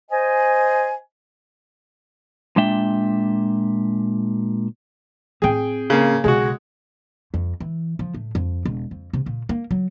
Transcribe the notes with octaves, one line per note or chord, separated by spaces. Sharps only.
C5 D#5 G#5
A#2 G#3 D4 E5 G5
A2 C4 G#4 G5
C#3 A#3
B1 C#3 G#3 F#4
F2
E3
F3
A2
F2
E1
F2
C3
A#2
A#3
F#3